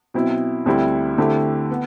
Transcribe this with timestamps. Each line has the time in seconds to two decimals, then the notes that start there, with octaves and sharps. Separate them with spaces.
0.14 B2 F#3 C4 E4
0.66 D2 D3 G3 C4 E4
1.18 D3 A3 C4 E4 G4
1.70 B3